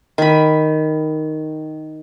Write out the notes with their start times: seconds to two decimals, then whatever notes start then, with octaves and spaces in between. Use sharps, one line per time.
0.18 D#3 B5